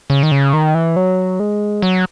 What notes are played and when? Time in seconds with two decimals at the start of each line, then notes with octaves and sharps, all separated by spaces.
0.10 C#3
0.23 D#3
0.32 C#3
0.53 D#3
0.75 E3
0.96 F#3
1.40 G#3
1.82 F#3